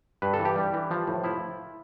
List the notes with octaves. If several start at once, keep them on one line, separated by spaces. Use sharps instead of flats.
G2 B4
A4
E3
G4
G3
E3
F3
A2
F3 E4